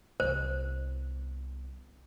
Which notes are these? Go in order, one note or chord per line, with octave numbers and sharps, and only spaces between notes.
C2 B3 C5